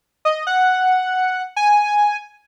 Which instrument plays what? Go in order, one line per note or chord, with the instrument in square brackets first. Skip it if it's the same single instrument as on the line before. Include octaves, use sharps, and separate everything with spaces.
[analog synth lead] D#5
F#5
G#5